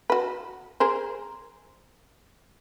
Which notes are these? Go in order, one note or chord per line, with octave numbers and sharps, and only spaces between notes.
F#4 B4
G#4 A#4 C5